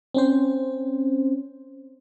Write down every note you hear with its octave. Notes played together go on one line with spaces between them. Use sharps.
C4 C#4 C5